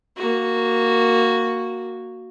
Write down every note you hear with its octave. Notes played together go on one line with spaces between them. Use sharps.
A#3 F#4